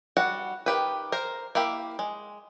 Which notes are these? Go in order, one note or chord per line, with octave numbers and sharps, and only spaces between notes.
G3 F#4 F#5
D#3 G4 B4
A#4 C5
A#3 E4 G4
G#3